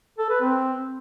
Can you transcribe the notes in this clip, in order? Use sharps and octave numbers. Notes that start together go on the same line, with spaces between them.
A4
B4
C4